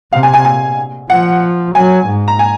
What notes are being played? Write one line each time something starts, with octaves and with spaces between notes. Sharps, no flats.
C3 F5
G#5
G#5
G#5
F3 F#5
F#3 G#5
G#2
A#5
G#5